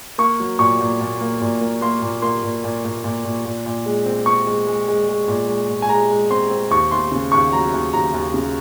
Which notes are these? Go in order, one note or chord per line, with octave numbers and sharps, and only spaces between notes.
A#3 C#6
F#3
A#2 C#6
A#2
A#2
A#3
A#2
A#3
A#3 C6
A#2
A#3 C6
A#2
A#2
A#2
A#2
A#2
A#2
A#2
G#3
C4
C4 C#6
G#3
G#3
G#3
G#3
A#2
G#3
A#2
G#5
G#3 A#5
G#3
C4 C6
C4
D#2 C#6
D#2 C6
C#3
D#2 C#6
F#3 A#5
D#2
D#2 A#5
D#2
C#3